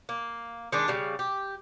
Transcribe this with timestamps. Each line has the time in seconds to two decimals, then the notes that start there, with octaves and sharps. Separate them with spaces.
0.09 A#3
0.72 D#3 G#3 D4
0.88 C#3 G3
1.19 G4